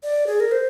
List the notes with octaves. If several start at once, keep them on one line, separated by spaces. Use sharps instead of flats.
D5
G#4
A#4
C5